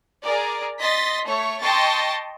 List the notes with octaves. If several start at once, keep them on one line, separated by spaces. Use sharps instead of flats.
G#4 A#4 D5
D#5 C6 A6 B6
A3 C#5 C#6
D#5 G5 A5 C6 C#6 A6